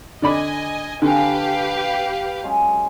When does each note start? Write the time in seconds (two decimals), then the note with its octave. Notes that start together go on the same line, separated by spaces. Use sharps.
0.22 D3 D5 D#5 G#5 B5
1.02 D3 G4 B4 F5 G#5 A5 C#6
2.43 F#3 G#3 C#4